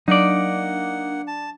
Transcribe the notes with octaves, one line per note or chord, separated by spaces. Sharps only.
F#3 A#3 D4 D#4 D5 F#5
A5